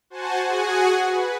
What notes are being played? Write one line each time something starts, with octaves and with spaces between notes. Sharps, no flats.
F#4 C5 F#5 G#5 A5
F#4 G#4 F#5 G#5
B4